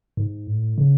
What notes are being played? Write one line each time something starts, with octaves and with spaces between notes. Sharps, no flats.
G#2
A2
C#3